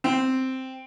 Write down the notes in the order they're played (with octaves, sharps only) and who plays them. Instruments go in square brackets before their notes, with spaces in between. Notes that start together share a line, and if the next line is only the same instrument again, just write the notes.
[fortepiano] C4